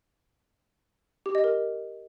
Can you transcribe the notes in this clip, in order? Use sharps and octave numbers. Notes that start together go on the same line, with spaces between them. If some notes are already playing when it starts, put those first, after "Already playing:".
G4
D#5
A#4